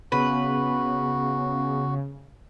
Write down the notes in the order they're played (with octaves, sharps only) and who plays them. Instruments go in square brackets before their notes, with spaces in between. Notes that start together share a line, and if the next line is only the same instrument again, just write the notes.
[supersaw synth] C#3 [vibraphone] B3 [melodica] F#4 [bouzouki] B4